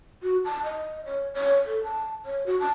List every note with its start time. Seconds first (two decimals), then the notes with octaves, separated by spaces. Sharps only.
0.23 F#4
0.45 A5
0.64 D#5
1.06 C#5
1.34 C#5
1.65 A4
1.84 A5
2.25 C#5
2.46 F#4
2.60 A5